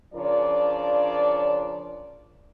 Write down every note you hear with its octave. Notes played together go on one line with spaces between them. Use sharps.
C#3 F3 D4 F4 A#4 D5